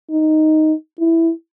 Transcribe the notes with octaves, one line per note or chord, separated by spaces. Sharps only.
D#4
E4